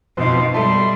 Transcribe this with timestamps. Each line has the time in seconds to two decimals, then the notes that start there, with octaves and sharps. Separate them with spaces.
0.17 F2 B2 C4 D#4 B4
0.54 B2 G3 A4 E5 A5 C6